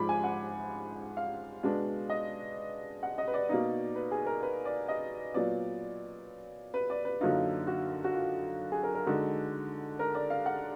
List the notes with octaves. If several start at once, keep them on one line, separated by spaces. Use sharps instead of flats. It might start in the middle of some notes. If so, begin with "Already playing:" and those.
Already playing: G#2 F3 G#3 B5 D6
G#5
F#5
F5
B2 G#3 B3 D4
D#5
F#5
D#5
B4
D5
B2 A#3 D#4
B4
G#4
A#4
B4
D5
D#5
A#2 F#3 B3 D5
B4
D5
B4
F#2 D3 F#3 A#3 D#4 F4
F#4
F#4
F4
G#4
A#4
A#4
D3 G#3 D#4 F#4
A#4
D5
F5
F#5